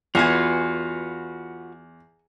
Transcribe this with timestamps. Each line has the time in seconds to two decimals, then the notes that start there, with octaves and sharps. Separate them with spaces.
0.15 E2 F4 F#4 B4 F#5 G#5